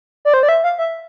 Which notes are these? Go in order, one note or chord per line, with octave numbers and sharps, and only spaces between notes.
D5
C5
D5
E5
F5
E5